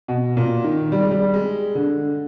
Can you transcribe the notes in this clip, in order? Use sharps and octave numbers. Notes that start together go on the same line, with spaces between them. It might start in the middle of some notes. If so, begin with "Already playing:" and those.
B2
A#2
D#3
G3
G#3
G3
G#3
D3